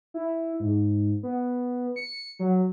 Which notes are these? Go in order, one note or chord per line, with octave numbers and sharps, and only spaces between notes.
E4
G#2
B3
C#7
F#3